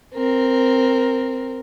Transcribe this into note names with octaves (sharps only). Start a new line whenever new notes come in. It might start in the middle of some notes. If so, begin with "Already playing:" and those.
C4 A#4